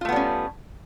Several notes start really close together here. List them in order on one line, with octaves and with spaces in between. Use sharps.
F4 A3 B3 G3 C#4